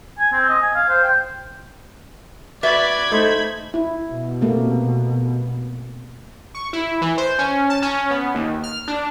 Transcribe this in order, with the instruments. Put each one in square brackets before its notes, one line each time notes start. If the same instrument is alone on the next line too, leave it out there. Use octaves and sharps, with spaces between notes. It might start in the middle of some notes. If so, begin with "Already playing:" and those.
[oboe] G#5
C4
D#5
G#5
F5
C5
G5
[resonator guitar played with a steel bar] F#4 B4 E5 [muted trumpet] D5 [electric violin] B5 G#6
[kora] A3 D#4 C5
[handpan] E4
[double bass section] B2
[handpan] C3 A3 A#3
[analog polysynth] C#6
E4
E3
C5
C#4
A5
C#4
B3
D#2
F6
D4